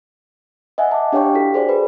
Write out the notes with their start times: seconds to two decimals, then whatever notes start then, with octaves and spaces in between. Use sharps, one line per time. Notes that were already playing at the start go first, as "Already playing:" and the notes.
0.78 D#5 E5 F#5 G#5
0.92 A5 D6
1.12 D4 G4 C#5 F5 G5 C#6
1.34 E4 F#4 A4 B6
1.54 G#4 C5 D5
1.69 B4 C5